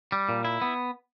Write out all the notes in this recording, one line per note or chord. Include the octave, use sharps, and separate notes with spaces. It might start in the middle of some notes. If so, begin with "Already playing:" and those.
G3
A#2
E4
B3